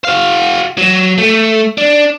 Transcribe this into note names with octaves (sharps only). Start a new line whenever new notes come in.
F#4 F5
F#3
A3
D4